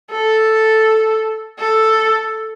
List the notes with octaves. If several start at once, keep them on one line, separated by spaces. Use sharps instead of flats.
A4
A4